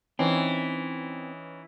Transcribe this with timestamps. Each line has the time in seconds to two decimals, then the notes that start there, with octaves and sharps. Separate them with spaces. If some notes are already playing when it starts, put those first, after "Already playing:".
0.19 E3 C4 C#4 D#4